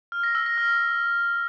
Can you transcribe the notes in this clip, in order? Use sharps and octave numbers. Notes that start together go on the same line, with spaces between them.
F6
A#6
E6
A#6
F6